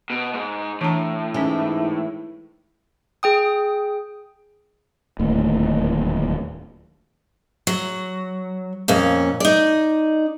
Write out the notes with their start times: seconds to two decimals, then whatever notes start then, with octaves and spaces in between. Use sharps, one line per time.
0.10 B2
0.34 G#2
0.81 A2 E3 D4 A#5
1.34 G#2 E3 C#4 G#5
3.23 G#4 G5 D#6
5.19 D1 D#2 A3
7.67 F#3
8.88 F2 A#2 C#4
9.40 D#4 D5